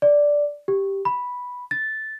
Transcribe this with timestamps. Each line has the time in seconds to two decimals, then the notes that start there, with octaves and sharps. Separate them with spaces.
0.02 D5
0.68 G4
1.05 B5
1.71 A6